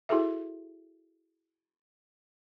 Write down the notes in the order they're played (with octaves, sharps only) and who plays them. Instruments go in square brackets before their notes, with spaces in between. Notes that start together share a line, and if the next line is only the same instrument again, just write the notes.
[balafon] E4 F#4 G#4 A4 E5